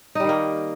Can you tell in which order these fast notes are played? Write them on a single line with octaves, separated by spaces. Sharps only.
D#4 G3 D#3 A#3